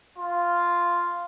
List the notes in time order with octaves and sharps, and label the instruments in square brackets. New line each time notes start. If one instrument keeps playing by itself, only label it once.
[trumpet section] F4